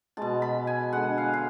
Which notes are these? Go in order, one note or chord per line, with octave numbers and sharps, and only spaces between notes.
B2 G#3 A5
B5
G#5
D3 G#3 F#5
F5
F5